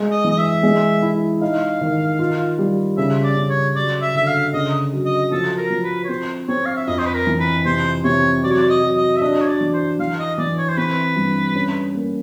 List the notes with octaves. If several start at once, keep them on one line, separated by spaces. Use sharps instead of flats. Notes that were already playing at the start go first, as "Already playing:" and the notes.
Already playing: G#3
D#5
E3
D#5
E5
G#3
E4
D#4 F5
D#3
F4
G3
C#3 E5
D5
C#3
C#5
F#3 D5
E5
D3 E5
F5
C#3 D#5
F#3
D#5
F3 A4
A#4
F3
B4
C#5
C4 C5
C4 C#5
F5
E5
F2 D#5
C5
B4
A#4
E3
B4
C3 C5
C3 C#5
F#3 D5
C#5
D5
D#5
F#3
D#5
E5
D4 D#5
C#5
D5
E3
C5
E3 F5
D#5
E3 D5
C#5
C5
C4 B4
G2
C#4
A#3